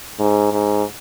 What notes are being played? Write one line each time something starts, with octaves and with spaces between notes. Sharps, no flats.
G#2
G#2